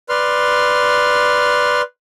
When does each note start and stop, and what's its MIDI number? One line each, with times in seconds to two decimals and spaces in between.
0.09 1.82 71
0.09 1.82 74
0.09 1.82 84
0.09 1.82 89